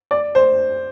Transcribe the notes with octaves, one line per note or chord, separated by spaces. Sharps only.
D5
C5